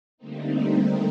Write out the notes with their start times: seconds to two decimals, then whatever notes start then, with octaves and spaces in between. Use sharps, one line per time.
0.18 D3 G3 A3 A#3 C4 D#4